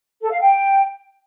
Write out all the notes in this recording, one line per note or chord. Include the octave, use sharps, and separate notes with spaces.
A4
F5
G5